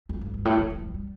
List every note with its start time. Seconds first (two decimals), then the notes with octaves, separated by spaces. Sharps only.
0.09 F2
0.21 G2
0.34 G2
0.45 A2
0.58 E3
0.70 E3
0.82 E3
0.94 G3